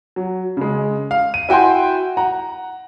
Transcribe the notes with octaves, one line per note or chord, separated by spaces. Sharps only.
F#3
C#3 G#3
F5
D#7
E4 F#4 G5 G#5 C6
F#5 A#5